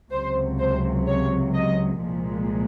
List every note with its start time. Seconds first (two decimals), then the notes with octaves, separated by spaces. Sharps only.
0.11 C#2 C3 F#3 C5
0.59 C5
1.07 C#5
1.54 D#5
2.01 C2 A#2 F3 G#3